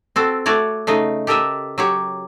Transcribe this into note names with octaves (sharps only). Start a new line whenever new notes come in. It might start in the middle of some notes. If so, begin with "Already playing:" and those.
C4 F#4 A4
A3 F#4 C#5 D5
C#3 A3 D#4 D#5
G4 A4 A#4 D#5 E5
F#3 G4 C#5